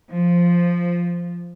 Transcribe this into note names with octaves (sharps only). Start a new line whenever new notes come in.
F3